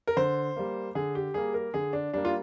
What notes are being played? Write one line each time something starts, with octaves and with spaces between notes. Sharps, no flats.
A#4
D3 C5
G3 A#3
D3 G#4
G4
G3 A#3 G#4
A#4
D3 G#4
D4
G3 A#3 D4
F4